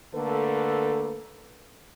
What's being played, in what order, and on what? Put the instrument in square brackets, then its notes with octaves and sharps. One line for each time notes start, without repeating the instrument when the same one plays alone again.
[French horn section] D3 A3 A#3 A4 B4